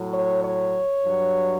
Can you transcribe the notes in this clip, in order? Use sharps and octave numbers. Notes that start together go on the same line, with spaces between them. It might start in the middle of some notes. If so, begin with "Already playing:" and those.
Already playing: A2 F#3
C#5
C#5
G2 F#3